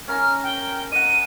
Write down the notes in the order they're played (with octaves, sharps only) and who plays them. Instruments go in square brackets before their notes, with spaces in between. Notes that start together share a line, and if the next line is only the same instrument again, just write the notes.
[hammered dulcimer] C#4 A#4 A#5 [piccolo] F6
[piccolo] G5
[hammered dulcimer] D#5 F#5 [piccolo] D#7